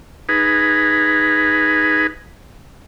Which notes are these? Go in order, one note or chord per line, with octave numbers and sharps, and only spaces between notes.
D#4 G#4 B4